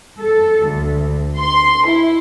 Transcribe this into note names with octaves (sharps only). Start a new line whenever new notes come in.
A4
D2
C6
E4